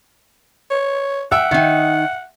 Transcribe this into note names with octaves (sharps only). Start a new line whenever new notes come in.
C#5
E5 F#5 G5 E6
D#3 D#4 E5 G5